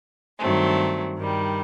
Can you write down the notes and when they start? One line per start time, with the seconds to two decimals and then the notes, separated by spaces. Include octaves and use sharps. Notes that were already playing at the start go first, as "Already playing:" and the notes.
0.38 G2 D#3 F#3 A3 C4
1.16 G2 D#3 G3